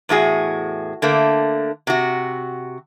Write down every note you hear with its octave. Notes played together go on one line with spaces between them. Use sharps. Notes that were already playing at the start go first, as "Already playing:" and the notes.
E2 A2 F#4 G#4
D3 A3 A#3
C3 F#4